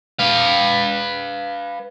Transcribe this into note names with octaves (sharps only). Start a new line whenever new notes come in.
B4 F5